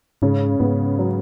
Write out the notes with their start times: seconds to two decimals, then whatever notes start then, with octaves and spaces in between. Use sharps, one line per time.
0.22 G#2 C#3
0.60 G#2 B3
0.99 F#3